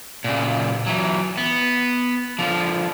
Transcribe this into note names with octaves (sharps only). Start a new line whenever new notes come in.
A#2 C#3
E3 F#3
B3
D3 F3